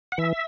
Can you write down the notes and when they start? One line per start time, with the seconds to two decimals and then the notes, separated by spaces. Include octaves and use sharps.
0.12 F#5
0.18 E3 E5